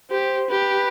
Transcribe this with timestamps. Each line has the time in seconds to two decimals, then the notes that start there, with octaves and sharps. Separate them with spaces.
0.11 G4 C5
0.50 G4 B4